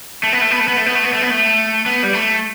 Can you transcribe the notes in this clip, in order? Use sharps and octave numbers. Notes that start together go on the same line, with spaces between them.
A3
B3
A3
B3
A3
B3
A3
B3
A3
B3
A3
B3
A3
B3
G3
A3